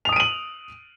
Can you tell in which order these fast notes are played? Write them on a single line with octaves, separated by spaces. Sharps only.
F7 D#6 D7 D#7 F#7